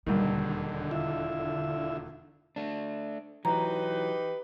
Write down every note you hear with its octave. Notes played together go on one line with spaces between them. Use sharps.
E1 D#2 D3 D#3 F#3 G3
E4 F4 E5
A3 D4
E3 F#3 D#4 G4 B4 A#5